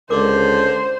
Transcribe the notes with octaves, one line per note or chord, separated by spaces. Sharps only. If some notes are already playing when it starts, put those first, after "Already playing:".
C#2 D3 A#4 C5 D6